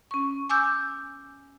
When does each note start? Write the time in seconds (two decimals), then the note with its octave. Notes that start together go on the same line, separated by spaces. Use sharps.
0.11 C#4 C#6
0.50 G#5 D6 E6 G6